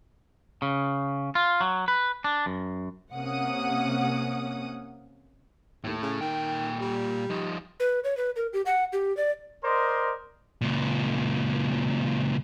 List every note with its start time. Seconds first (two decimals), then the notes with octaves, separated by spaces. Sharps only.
0.62 C#3
1.35 F4
1.61 F#3
1.88 B4
2.24 D4
2.46 F#2
3.12 C3 A#3 C#4 F#5 D#6
5.84 D#2 A2 A3
6.01 C#3
6.21 A#2 D#3 G5
6.80 G3
7.30 F3 D#4
7.80 B4
8.04 C#5
8.17 B4
8.36 A#4
8.53 G4
8.66 F#5
8.93 G4
9.17 D5
9.63 A#4 C5 D5 D#5 C6
10.61 C#2 A#2